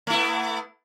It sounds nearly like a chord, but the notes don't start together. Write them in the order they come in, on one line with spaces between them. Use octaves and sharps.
A3 E4 B3